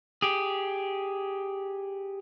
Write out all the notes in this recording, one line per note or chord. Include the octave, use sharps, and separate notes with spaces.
G4 G#4